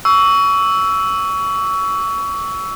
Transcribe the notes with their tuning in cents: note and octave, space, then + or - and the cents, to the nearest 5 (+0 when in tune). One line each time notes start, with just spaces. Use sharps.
C#6 +25 E6 +0